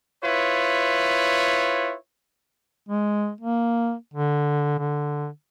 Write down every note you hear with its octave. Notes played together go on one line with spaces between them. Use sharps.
E4 F4 B4 C#5
G#3
A#3
D3
D3